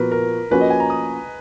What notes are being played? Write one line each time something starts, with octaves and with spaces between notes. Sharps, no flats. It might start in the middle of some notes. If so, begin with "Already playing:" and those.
Already playing: A#2 F3 B3 F#4 A#4 B4
A#4
F3 A#3 C#4 F#4 B4
D#5
G#5
A#5
D#6